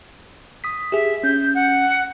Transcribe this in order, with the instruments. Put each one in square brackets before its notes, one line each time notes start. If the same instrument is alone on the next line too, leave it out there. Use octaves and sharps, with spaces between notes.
[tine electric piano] D#6 B6
[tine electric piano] G4 G#4 [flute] E5
[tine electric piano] C#4 [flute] G6
[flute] F#5